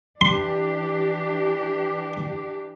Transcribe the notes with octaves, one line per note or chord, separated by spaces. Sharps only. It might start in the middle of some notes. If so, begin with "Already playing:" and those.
E3 D4 G4 C6